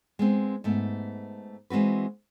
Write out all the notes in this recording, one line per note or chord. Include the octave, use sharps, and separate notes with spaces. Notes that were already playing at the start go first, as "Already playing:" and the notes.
G#3 B3 C4
G#2 A3 B3
E3 G#3 C4 F#4 B4